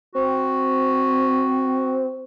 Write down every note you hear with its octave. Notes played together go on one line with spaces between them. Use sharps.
C4 F#4